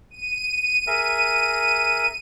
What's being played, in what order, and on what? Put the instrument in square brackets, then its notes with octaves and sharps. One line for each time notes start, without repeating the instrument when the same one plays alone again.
[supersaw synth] D#7
[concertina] G#4 A#4 E5